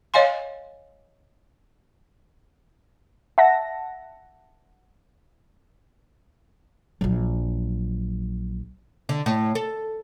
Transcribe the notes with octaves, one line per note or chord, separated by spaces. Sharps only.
C#5 D#5 F5 G#5 C6
E5 F#5 A5 A#6
A#1 F#3
D3
A2
A4